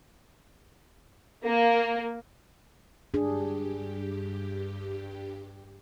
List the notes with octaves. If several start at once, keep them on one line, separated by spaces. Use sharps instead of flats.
A#3
G2 D4 G4 G#4